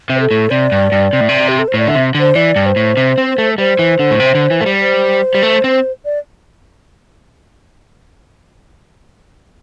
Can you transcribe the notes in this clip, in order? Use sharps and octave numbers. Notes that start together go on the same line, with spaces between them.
C3
C5
A4
A2
C3 D5
G2
G2
C3
A2
C3
G4
A4
C5
A2 D5
D3 E5
C3
D3
C5
E3 D5
G2
C5
A2
C3
C4
A3
G3 C5
E3
D3
A2
C3
D3
E3
A3
G3
C5
G3
A3
C4
D5